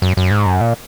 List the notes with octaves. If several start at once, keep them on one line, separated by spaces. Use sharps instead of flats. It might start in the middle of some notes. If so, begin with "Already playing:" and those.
F#2
F#2
G#2
F#2
A#2